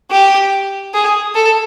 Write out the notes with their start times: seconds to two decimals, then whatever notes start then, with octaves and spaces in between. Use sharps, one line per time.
0.11 G4
0.94 G#4
1.35 A4